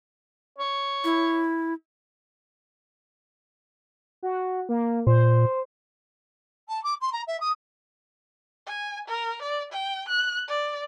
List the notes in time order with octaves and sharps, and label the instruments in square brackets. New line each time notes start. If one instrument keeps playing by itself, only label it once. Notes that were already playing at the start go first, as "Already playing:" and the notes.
[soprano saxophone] C#5
[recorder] E4
[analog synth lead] F#4
A#3
[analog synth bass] A#2 [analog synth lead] C5
[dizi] A5
D6
C6
A#5
E5
D#6
[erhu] G#5
A#4
D5
G5
F#6
D5